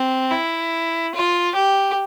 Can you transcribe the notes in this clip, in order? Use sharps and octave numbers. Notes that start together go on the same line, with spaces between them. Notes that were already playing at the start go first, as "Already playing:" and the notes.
Already playing: C4
E4
F4
G4